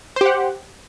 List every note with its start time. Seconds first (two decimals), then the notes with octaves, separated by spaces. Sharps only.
0.16 C5
0.21 G4
0.26 F#5